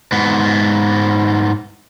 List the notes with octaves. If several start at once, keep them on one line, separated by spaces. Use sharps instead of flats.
G#2 B3